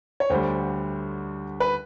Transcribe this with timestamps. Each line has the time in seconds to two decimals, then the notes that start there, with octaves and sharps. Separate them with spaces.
0.20 C#5
0.30 D2 D3 G3 C5
1.60 B4